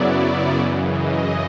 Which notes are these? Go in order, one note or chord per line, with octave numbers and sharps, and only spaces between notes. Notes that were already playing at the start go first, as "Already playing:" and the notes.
Already playing: F#2 C#3 F#3 B3 E4 D5
F#2 C#3 E3 D#5
D#5